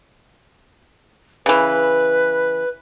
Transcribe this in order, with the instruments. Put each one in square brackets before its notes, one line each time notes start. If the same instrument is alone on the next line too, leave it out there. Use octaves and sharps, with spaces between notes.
[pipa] C#3 E3 [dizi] B4